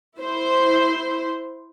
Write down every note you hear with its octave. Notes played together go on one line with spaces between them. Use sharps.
E4 C5